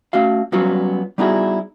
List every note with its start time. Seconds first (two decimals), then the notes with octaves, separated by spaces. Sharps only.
0.13 A3 C#4 F#4 F5
0.52 F#3 G3 B3 C#4 F4 F#4
1.18 G3 B3 D#4 E4 F#4 G#4